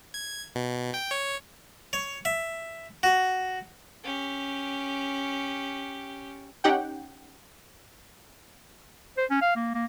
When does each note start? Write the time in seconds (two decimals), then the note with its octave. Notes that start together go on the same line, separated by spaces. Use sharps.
0.14 G#6
0.55 B2
0.94 G5
1.11 C#5
1.93 C#5
2.25 E5
3.03 F#4
4.04 C#4 G4
6.64 C#4 D#4 G4 F#5 G5
9.17 C5
9.30 C#4
9.42 F5
9.56 A#3
9.74 A#3